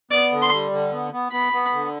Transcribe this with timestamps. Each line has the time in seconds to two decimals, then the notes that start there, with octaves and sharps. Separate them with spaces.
0.11 B3 D5
0.32 D3
0.42 C6
0.52 G3
0.71 D3
0.92 B3
1.13 B3
1.32 B3 B5
1.53 B3
1.73 D3